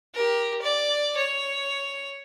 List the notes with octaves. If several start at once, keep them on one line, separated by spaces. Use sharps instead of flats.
G4 A#4
D5
C#5